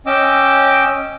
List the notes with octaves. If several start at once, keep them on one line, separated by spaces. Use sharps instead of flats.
C#4 D#5 G5 D6 E6